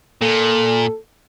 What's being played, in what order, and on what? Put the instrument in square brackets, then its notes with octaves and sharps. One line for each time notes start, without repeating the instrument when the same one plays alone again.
[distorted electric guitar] A#2 [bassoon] A4